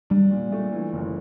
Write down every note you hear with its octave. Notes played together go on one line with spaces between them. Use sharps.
G3 D4
A#2
A3
E3
F#1